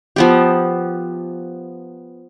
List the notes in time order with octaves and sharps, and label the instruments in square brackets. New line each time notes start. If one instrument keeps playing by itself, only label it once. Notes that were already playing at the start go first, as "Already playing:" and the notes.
[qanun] F3 B3 G4